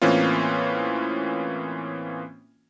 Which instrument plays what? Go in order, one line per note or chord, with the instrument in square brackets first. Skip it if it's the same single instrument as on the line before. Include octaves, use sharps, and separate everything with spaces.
[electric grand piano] A2 E3 A#3 C4 C#4 F4